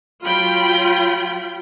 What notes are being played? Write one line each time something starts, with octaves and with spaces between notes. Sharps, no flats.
F#3 F4 G5 B5